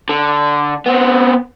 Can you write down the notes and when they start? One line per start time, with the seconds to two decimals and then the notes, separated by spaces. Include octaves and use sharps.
0.09 D3
0.86 B3 C4